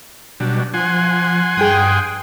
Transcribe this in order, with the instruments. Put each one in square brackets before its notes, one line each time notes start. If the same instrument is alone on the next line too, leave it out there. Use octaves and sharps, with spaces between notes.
[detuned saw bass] B2 [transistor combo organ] F#3 G3 D4
[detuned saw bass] F3 [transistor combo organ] F#5 G#5 C6
[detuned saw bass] G2 [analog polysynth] G#4 G5 D#6